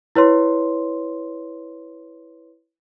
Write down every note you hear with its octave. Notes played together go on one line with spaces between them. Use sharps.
E4 B4 C#5 C6